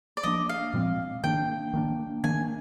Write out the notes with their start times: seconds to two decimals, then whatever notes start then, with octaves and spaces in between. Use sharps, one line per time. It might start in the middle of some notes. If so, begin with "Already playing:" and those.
0.17 D5
0.23 F3 A#3 D4 D#5
0.49 F5
0.74 A#2 F3 G#3 C4
1.24 D#3 A#3 D4 G5
1.74 D#3 A#3 D4
2.24 D#3 A#3 D4 G#5